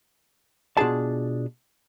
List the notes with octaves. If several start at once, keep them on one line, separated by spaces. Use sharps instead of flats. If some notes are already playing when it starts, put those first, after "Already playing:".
B2 D4 F4 G#4 A5